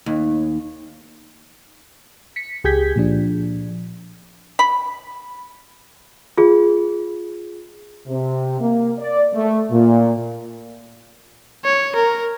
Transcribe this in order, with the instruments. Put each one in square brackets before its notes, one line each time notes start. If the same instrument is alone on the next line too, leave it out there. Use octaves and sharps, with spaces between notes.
[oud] D#2
[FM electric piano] B6 C#7
C#2 G4 G#4 G6 G#6 B6
A#2 F3 D4
[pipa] B5
[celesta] F4 G#4
[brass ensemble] C3
A#3
D5
A3
A#2
[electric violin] C#5
A#4